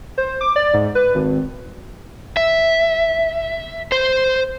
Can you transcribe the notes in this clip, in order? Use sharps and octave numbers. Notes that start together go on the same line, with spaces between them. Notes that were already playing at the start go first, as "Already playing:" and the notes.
C5
D6
D5
G#2
B4
G#1
E5
C5